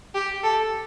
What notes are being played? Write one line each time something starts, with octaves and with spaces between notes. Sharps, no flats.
G4
A4